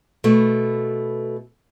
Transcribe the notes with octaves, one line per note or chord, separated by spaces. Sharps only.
B2 A3